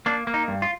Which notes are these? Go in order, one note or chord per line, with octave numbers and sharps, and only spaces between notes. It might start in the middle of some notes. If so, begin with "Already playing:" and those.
A#3 D4
A#3
D#4
G2
F4